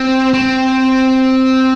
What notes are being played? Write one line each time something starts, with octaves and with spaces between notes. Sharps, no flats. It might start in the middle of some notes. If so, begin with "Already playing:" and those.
Already playing: C4
C4